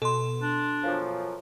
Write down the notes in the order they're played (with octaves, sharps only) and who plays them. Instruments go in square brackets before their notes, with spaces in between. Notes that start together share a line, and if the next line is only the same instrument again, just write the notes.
[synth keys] B2 [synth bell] A4 C6
[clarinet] D4
[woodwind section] F#2 F3